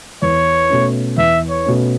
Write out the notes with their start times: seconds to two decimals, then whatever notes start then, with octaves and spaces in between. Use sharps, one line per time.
0.22 E2 C#5
0.69 B2 A3 C#4
1.17 E2 E5
1.49 C#5
1.65 B2 A3 C#4